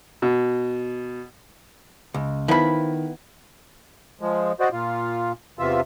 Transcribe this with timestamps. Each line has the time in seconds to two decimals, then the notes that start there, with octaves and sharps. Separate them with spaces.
0.22 B2
2.14 C#2
2.48 D#3 F3 B3 E4 B5
4.21 F3 G#3
4.60 F#4 C5 D5 D#5
4.72 A#2 F4
5.59 E2 C3 E3 F4 E5